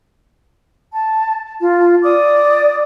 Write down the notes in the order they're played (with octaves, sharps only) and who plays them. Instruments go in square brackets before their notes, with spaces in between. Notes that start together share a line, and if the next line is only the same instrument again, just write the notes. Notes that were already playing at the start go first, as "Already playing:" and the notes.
[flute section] A5
F4
D5 D6 D#6